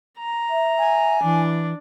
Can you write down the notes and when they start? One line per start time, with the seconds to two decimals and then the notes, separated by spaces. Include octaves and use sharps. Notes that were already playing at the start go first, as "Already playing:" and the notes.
0.19 A#5
0.50 E5
0.79 G#5
1.23 E3 D4